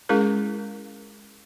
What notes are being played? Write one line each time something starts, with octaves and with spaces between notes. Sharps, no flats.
G#3 C#4 E4 G#4 A#4